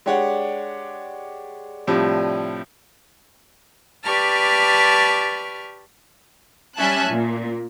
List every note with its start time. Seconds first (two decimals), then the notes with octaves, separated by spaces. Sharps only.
0.06 G#3 D4 G4 C#5 D5 F#5
1.87 A2 C3 F3 G3 D4
4.04 G4 B4 D5 A5 C#6 F6
6.76 G3 C#4 E5 G#5 A5 F#6
7.10 A#2